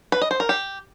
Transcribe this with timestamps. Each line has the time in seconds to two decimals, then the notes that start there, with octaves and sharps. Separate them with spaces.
0.12 B4
0.21 D#5
0.31 C5
0.40 A#4
0.49 G4